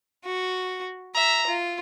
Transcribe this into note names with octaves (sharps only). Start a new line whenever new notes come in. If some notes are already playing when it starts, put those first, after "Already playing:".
F#4
E5 A#5
F4